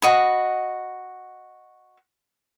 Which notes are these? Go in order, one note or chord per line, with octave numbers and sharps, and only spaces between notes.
F#4 D#5 B5